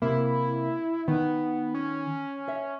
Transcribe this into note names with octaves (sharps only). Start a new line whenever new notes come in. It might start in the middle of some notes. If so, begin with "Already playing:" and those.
C3 A#3 E4
D#3 B3
C#4
E5